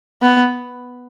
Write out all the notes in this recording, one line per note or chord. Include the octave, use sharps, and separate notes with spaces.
B3